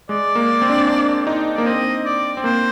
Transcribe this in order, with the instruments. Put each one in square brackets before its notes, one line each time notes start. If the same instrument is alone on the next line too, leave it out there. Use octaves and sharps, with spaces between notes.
[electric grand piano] G#3 [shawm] D5
[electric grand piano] A#3
C4
D4
C4
D4
D#4
[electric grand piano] A#3 [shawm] D5
[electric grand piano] C4 [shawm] D#5
[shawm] D5
[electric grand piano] C4
[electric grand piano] A#3 [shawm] C5